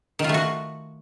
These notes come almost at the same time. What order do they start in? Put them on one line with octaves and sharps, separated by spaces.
D#3 F4 A3 F#4